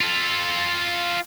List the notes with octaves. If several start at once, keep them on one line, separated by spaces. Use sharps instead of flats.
F4 A4